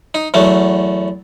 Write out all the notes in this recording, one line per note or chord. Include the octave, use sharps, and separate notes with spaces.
D#4
E2 F#3 A3